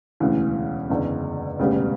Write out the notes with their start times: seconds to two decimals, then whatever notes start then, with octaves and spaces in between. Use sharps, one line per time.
0.20 E1 D2 C#3 E3
0.90 F#1 E2 D3
1.59 E1 D2 C#3 G3 B3